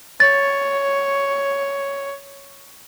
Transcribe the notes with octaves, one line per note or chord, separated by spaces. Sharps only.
C#5 A6